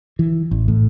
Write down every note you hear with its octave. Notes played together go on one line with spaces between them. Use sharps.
E3
A1
A2